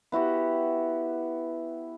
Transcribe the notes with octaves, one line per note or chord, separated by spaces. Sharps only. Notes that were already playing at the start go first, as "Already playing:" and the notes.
B3 E4 F#4 G4